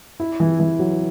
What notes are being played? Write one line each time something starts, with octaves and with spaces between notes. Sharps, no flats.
E4
E3
E3
F#3